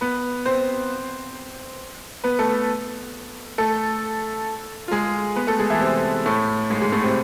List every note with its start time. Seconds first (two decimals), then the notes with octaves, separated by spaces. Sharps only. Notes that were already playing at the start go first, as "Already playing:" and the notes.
0.01 B3 B4
0.46 C4 C5
2.24 B3 B4
2.39 A3 A4
3.58 A3 A4
4.88 F4
4.91 G#3 G#4
5.36 B3 B4
5.47 A3 A4
5.59 G#3 G#4
5.70 E3 E4
5.81 C3 C4
6.26 A2 A3
6.70 G#2 G#3
6.82 G#2 G#3
6.92 A2 A3
7.04 C3 C4